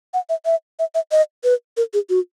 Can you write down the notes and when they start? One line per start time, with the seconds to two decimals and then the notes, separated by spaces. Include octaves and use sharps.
0.14 F#5
0.29 E5
0.45 E5
0.79 E5
0.95 E5
1.12 D#5
1.44 B4
1.77 A#4
1.94 G#4
2.09 F#4